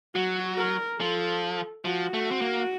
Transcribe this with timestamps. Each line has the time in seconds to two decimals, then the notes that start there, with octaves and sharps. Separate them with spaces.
0.15 F#3 F#4
0.57 A#4
0.99 F3 A4
1.85 F3 F#4
2.14 A3
2.31 C4
2.41 A#3